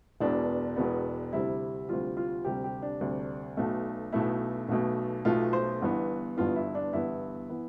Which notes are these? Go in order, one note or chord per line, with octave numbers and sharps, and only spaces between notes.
E1 E2 B2 B3 D4
E1 E2 B2 B3
D2 C3 G3 E4
D2 C3 G3 F4
F4
D2 C3 G3 G4
G4
D4
D2 C3 G3
B1 B2 A3
B1 B2 A3 E4
B1 B2 A3
B1 B2 A3 F4
C5
G1 G2 E3 B3
G1 G2 E3 B3 F4
E4
D4
G1 G2 E3 B3 E4
E3 B3